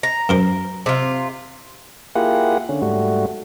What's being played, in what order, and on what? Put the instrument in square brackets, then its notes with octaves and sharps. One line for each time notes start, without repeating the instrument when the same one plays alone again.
[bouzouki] A#5
[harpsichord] F#2 A#4 C5
[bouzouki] C3 F4
[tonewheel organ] A#3 E4 F4 G4 G#4 F#5
D3 C#4
G#2 G3 A3 F#4